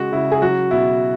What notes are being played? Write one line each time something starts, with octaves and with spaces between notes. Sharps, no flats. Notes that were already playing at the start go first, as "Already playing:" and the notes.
Already playing: C#3 G#3 F#4
C#3 E4
G#4
F#3 F#4
B2 E4